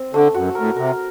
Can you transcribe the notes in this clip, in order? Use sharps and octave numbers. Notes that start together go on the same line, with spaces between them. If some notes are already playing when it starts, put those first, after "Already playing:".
Already playing: C4
D3 A3
F#2 F#4
A2 A#4
C3 A#4